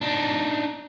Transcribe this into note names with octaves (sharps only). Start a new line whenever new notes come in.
D4 D#4